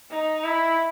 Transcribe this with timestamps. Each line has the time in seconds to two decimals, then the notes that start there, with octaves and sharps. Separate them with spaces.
0.11 D#4
0.44 E4